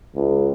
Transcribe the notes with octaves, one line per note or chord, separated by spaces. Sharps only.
C#2